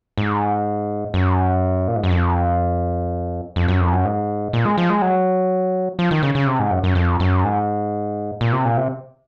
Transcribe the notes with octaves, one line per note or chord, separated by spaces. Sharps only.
G#2
F#2
A#2
G#2
F#2
F2
F2
F#2
F2
F#2
G#2
A#2
G#3
F3
G#3
F#3
F3
D#3
C#3
C#3
C3
G#2
F#2
F#2
F2
F#2
G#2
A#2
C3
A#2
C3